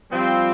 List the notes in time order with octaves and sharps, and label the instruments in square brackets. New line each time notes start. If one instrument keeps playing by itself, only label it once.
[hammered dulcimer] F3 [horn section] G3 C4